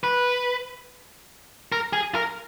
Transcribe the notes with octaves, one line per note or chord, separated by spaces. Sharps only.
B4
A#4
G#4
A#4